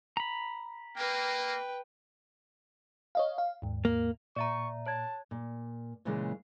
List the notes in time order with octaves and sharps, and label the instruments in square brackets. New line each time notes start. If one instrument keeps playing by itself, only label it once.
[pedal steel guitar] A#5 B5
[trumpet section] A#3 [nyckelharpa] B4 G5
[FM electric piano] C#5 D#5 F5
F5
D#2 G#2
[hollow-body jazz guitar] A#3
[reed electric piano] A#2 [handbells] D5 E5 A#5 [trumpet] C#6
[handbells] C#5 G#6 [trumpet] A5
[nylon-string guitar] A#2
A#2 C#3 E3 G#3 A#3